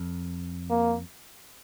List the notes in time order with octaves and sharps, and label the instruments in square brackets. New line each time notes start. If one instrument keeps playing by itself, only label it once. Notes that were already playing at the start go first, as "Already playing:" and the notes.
Already playing: [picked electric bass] F2
[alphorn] A#3